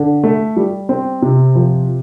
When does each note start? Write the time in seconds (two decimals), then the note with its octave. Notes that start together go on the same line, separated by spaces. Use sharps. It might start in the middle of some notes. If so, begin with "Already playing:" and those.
Already playing: D3
0.24 A3
0.56 G3
0.89 C4
1.22 C3
1.55 F3